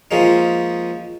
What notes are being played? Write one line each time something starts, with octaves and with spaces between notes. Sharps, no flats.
F3 G#3 A#3 C#4 D#4